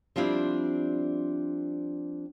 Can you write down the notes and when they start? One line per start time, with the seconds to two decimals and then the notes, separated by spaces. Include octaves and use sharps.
0.16 F3 G3 C4 D4 E4